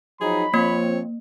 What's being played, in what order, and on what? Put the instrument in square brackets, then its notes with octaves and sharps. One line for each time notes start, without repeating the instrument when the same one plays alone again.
[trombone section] F3 F#3 D#4 [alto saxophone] G#4 [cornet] B5
[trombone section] F3 C4 [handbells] A#3 [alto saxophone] C#5